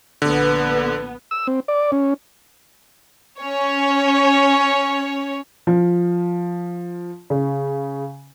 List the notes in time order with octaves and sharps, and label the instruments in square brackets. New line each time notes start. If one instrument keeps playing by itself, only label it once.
[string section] A#1 B3 [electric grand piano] D3
[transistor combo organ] E6
C4
D5
C#4
[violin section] C#4 C#5
[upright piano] F3
C#3